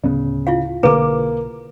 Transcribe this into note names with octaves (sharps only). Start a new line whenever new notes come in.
D1 C#3 B3
E4 F4 F5
B1 D3 A#3 G#4 B4 A#5 D6